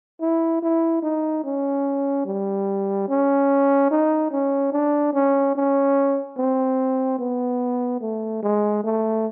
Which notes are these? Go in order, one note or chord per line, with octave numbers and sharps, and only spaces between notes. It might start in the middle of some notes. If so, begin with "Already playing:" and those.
E4
E4
D#4
C#4
G3
C#4
D#4
C#4
D4
C#4
C#4
C4
B3
A3
G#3
A3